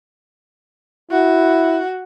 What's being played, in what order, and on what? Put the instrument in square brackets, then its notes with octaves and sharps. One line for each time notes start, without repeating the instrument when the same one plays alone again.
[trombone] E4 [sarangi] F#4